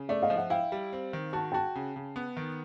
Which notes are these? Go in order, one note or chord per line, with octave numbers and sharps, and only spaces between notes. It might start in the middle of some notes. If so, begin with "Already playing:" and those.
Already playing: C#3
A3 D5 E5
D#5 F5
F3
E5 F#5
E4 F5 G5
G3
C4
D#3
F#4 A5
F#4 G5 A5
C#3
C#3
B3
D#3